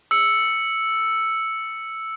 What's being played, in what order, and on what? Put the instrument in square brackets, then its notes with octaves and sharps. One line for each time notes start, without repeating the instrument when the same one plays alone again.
[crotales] E6 C#7